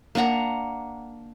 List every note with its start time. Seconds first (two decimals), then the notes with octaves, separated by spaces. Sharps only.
0.15 A#3 D4 F#5 A#5